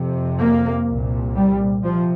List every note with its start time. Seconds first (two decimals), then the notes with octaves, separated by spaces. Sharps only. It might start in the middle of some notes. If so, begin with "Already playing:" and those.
Already playing: F2 C3
0.39 A#3
0.87 C2 A#2
1.36 G3
1.83 C3 F3